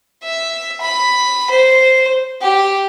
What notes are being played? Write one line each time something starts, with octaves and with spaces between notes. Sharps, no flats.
E5
B5
C5
G4